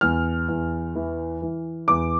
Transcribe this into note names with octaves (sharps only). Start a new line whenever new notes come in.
E2 F6
E2
E3
E3
E2 D6